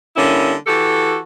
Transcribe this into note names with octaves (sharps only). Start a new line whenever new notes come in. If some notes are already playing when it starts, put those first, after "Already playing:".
D3 G3 A#3 C#4 E4
E3 F#4 G4 A4